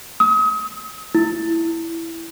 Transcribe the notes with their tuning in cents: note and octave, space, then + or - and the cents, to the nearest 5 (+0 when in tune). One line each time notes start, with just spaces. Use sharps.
D#6 +40
E4 +5